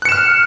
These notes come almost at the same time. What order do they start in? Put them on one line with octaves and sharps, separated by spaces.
F#6 C#7 E7 F6